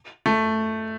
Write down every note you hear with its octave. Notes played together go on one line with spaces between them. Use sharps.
A3